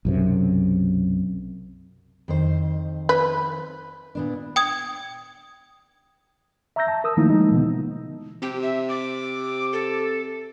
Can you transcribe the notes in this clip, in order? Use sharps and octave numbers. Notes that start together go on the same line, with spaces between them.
B1 F#2 C3
F2 D#3 C5
B4
A#2 B3 D4
G5 D#6 G#6
E5 A#5 C#6 E6 G6 A#6
A5
A#4 D#6 E6
D#3 F3 A3 A#3 D#4 E4
F3 G#3 D#4
B2 D3 E3 B3
C3 G4
E5
D6
A4